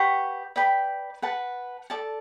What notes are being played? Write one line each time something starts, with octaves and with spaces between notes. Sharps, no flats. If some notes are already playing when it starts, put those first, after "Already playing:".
Already playing: G4 B4 F#5 C#6
B4 D5 G5 B5
B4 F#5 A5
A4 D5 A5